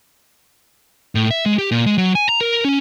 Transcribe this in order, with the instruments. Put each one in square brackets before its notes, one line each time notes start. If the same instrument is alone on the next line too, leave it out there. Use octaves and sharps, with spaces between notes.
[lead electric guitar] A2
E5
G#3
G4
A#2
G#3
F#3
G#5
A#5
A#4
C#4